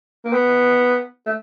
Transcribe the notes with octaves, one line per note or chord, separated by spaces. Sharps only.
A#3
B3
A3